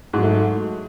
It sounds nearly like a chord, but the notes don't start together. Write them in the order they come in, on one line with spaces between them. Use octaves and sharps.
G#2 F#3 A3